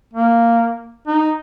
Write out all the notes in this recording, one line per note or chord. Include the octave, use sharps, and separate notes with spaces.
A#3
D#4